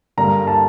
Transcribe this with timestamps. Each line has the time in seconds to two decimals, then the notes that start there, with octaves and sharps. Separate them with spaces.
0.17 G2 D3 G3 A#3 A#5
0.47 A5